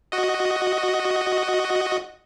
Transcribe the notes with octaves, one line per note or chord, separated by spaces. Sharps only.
F#4 D#5